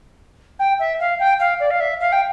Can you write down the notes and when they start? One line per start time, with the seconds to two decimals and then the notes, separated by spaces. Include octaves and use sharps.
0.59 G5
0.79 E5
1.00 F5
1.20 G5
1.40 F5
1.60 D5
1.71 F5
1.80 E5
2.00 F5
2.12 G5